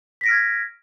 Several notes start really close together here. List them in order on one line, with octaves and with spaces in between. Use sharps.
B6 A#6 D7 F6 G#6